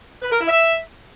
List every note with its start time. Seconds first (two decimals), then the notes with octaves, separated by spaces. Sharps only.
0.22 B4
0.31 A#4
0.39 E4
0.48 E5